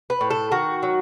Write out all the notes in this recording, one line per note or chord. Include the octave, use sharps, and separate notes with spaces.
B4
A2
A4
D#3 F#4
F#3